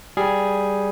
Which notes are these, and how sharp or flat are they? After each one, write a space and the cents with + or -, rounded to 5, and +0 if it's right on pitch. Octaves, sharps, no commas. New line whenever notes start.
G3 +0 G#4 +0